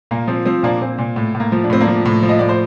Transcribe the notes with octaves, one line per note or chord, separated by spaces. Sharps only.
A#2 A#3
F3 C4
F3 C4
A#2 A#3 D4
A#2 C4
A#2
A2
A2
A#3
F3
D4
A2 C4
A#3 D4
F3
A2
F3
D#5
A2 D5
C5